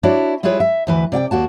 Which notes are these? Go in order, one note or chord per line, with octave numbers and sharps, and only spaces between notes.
D4 E4 F#4 C#5 D5
G3 E4 F4 G#4 B4 C#5
E5
D2 E3 B4
C3 D5 F#5 G5
D#2 A#3 F#4 A5